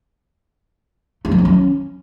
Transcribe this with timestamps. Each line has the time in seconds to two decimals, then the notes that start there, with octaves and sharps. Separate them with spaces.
1.25 A3
1.31 F#3
1.38 C4
1.45 C#4